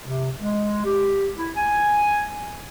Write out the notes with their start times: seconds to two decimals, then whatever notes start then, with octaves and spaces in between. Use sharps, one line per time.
0.04 C3
0.39 G#3
0.85 G4
1.37 E4
1.57 G#5